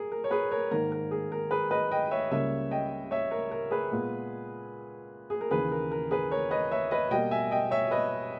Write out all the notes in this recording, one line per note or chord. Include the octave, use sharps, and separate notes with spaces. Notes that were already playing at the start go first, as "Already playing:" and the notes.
Already playing: G#4 A#4
A#4
C#5
G#4 B4
A#4 C#5
G#2 D#3 A#3 A#4
A#4
G#4
A#4
G#4 B4
B4 D#5
D#5 G5
C#5 E5
C#2 C#3 G3 A#3 C#5 E5
D#5 G5
C#5 E5
A#4 C#5
A#4
G#4 B4
A#2 G#3 B3
G#4
A#4
D#2 C#3 E3 G#4 B4
A#4
A#4
G#4 B4
A#4 C#5
B4 D#5
C#5 E5
B4 D#5
B2 G3 A#3 D#5 G5
E5 G#5
D#5 G5
C#5 E5
B4 D#5